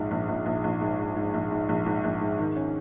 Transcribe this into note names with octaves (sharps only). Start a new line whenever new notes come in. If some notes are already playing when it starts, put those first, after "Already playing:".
Already playing: A#1 G#2 F3
A#1
A#1
A#1
A#1
G#2
G#2
G#2
A#1
G#2
A#1
G#2
A#1
G#2
D#3
C#4